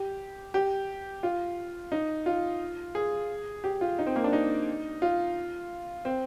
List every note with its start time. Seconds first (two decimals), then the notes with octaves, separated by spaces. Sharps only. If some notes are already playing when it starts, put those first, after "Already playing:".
Already playing: G4
0.54 G4
1.23 F4
1.92 D#4
2.26 F4
2.95 G#4
3.64 G4
3.81 F4
3.99 D#4
4.07 C4
4.16 A#3
4.24 D4
4.33 D#4
5.02 F4
6.05 C4